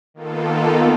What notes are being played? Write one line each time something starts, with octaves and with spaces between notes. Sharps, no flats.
D#3 A#3 B3 F4 A4